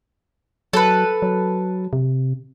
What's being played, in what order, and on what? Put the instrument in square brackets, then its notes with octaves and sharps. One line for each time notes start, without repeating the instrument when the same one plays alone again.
[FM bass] F#3 [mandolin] A4 B4
[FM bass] F#3
C3